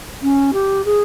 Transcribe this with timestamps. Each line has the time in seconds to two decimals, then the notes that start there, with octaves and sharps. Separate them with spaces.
0.22 C#4
0.53 G4
0.85 G#4